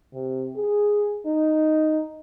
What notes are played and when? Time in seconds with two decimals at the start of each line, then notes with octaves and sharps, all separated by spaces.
0.13 C3
0.56 G#4
1.26 D#4